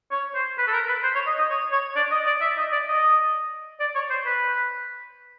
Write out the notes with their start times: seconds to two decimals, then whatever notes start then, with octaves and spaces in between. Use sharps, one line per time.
0.11 C#5
0.35 C5
0.58 B4
0.67 A4
0.73 A#4
0.88 B4
1.03 C5
1.15 C#5
1.27 D#5
1.38 D#5
1.50 C#5
1.72 C#5
1.96 D5
2.11 D#5
2.26 D5
2.41 E5
2.57 D#5
2.72 D5
2.88 D#5
3.80 D5
3.95 C#5
4.10 C5
4.26 B4